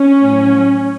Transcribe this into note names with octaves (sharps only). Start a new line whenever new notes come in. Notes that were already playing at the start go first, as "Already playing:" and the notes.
Already playing: C#4
A2 F#3